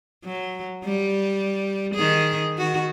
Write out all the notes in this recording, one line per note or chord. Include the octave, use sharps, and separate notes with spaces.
F#3
G3
D#3 G#4
D#3 F#4